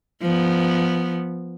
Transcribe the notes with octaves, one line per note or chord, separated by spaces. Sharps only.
F3 B3